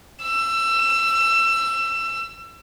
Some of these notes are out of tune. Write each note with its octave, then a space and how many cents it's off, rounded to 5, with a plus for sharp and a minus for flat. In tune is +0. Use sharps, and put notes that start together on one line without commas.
E6 +25